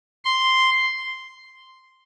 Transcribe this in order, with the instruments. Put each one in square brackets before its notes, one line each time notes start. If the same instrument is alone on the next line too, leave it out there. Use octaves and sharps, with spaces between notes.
[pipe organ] C6